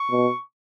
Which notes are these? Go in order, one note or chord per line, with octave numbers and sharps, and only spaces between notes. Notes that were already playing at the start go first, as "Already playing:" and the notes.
Already playing: C#6
B2